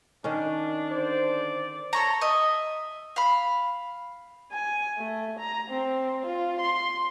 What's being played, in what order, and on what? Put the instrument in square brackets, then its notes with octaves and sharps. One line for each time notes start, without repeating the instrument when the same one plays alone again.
[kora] D#3 C#4 [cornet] D4
[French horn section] D3 C5 [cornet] D5
[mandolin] A4 C#5 A#5
D#5 E5
F5 B5
[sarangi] G#5
A3
A#5
C4
F4
C6